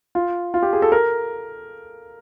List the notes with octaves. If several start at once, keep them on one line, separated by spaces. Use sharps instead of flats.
F4
F4
G4
G#4
A4
A#4